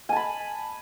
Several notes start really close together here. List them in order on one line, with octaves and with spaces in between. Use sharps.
G#5 A5 B5